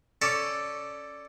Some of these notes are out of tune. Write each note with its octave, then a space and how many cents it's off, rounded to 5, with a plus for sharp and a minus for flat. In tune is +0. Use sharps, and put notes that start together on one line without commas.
C#4 +0 A4 +0 D5 +0